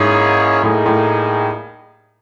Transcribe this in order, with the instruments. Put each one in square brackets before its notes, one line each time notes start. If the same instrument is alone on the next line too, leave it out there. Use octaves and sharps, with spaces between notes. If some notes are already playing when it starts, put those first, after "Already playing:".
Already playing: [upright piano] G#2 [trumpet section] A#3 C#4 E4 G#4 C#5
[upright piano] A2 [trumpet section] G3 A#3 D#4 G#4
[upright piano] A2